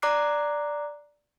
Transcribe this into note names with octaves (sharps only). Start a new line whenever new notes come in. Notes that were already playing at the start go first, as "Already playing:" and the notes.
D5 A#5 D6 F#6 C7